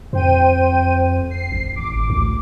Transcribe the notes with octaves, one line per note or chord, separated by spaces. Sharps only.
F2 C5 G5 D#7
C7
G#1
A1 D6
D2